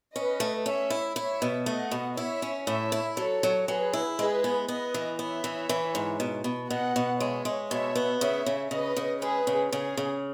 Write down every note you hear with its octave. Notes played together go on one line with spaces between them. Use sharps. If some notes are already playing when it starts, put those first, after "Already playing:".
C#4 B4 D#5
A3
C#4 C#5 E5
E4
E4 C#5 E5
B2
A3 D#5 F#5
B2
E4 C#5 E5
C#4
A2 C#5 E5
E4
F#3 A4 C#5
F#3
F#3 G#4 B4
E4
G#3 G#4 B4
B3
B3 B4 D#5
E3
B3 C#5 E5
E3
E3
G#2
B2
B2
B2 D#5 F#5
B2
G#3 C#5 E5
G#3
B2 C#5 E5
B3
C#3 C#5 E5
C#3
C#3 B4 D#5
C#3
G#3 G#4 B4
C#3
C#3 G#4
C#3